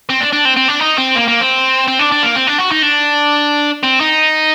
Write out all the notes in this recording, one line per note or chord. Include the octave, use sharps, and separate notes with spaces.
C4
D4
D4
C4
C4
D4
D#4
C4
A#3
A#3
C4
C4
D4
D4
A#3
C4
D4
F#4
D#4
D4
C4
D#4